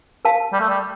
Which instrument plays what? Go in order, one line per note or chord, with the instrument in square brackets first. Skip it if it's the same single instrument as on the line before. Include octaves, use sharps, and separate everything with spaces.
[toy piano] A#4 F5 A5
[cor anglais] G3
A3
G3